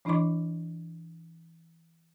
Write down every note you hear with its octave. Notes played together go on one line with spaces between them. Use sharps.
E3 D4 E4 D#5 C6 D6